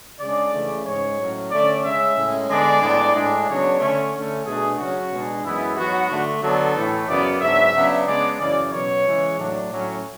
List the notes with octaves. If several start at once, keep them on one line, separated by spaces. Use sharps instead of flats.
C#3 G#3 D4 D5
C#3 E3 A3 C#4
G#2 G#3 C#4 C#5
A2 F#3 C#4
D3 A3 C#4 D5
C#3 G#3 C#4 E5
A2 G#3 C#4
D3 G#3 B3 D4 D5
A2 G#3 B3 D4
A2 G#3 D4
C#3 F#3 B3 D4 C#5
D3 A3 C#4
D3 A3 C#4
B2 A3 D4 G#4
C#3 F#3 C#4 F#4
B2 G#3 D4
F#2 E3 G#3 B3 E4
G#2 F#3 B3 F#4
D3 A3 D4
D3 F#3 B3 D4 A4
A2 E3 A3
F#2 C#3 F#3 B3 D5
G#2 F#3 B3 D4 E5
C#3 F#3 B3 D4
C#3 G#3 B3 D4 D5
F#2 C#3 E3 D5
B2 F#3 C#4 C#5
C#3 E3 G#3
A2 F#3 A3 D4
A2 F#3 C#4